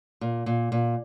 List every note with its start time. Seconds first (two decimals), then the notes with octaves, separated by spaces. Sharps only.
0.21 A#2
0.46 A#2
0.72 A#2